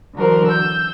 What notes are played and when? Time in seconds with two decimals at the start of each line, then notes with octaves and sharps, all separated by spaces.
0.15 D3 E3 F#3 F#4 A#4 C5
0.47 E6 G6